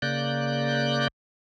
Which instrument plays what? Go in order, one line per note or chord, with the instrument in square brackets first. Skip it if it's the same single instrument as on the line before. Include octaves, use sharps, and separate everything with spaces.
[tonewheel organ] C#3 A#3 D5 F#6 G6